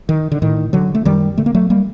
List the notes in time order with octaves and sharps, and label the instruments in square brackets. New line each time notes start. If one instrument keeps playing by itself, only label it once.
[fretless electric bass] D#3
D3
A2 D#3
D3 F#3
A3
F#2 D#3 G3
D3 A3
A#3
F#3 A3
G3 A#3